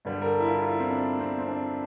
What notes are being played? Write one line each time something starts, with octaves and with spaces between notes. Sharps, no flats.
G2 D3 G3
A#4
A4
E4
F4
F4
E4
C4
D4
C4
C4
D4